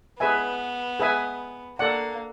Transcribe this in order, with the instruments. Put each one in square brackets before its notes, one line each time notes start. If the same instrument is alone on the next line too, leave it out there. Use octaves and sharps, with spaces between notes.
[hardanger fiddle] B3 [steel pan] G#4 B4 E5 G#5
[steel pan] G#4 B4 E5 G#5
[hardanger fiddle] A#3 [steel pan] A4 D5 F#5